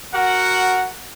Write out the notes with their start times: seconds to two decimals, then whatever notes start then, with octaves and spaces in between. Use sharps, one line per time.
0.13 F#4 A#4 F#5